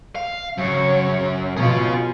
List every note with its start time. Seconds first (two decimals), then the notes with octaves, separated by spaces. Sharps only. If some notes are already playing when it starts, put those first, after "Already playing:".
0.15 F5
0.58 F#2 C#3 C#5
1.57 B2 F4 G#4 C#5